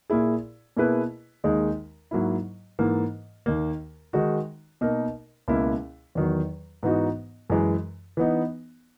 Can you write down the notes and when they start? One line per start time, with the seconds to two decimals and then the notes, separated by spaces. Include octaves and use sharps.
0.10 A#2 A#3 E4 G#4
0.77 B2 A#3 E4 G#4 B4
1.44 D#2 D#3 G#3 D#4
2.11 G#2 F#3 A#3 E4
2.79 G#2 E3 A#3
3.46 D#2 D#3 A#3
4.13 D#3 G#3 D#4 F#4
4.81 B2 A#3 D#4 A#4
5.48 C#2 B2 A#3 C#4 E4
6.15 E2 D#3 F#3
6.83 G#2 E3 B3 D#4 F#4
7.50 F#2 E3 G#3
8.17 E3 B3 D#4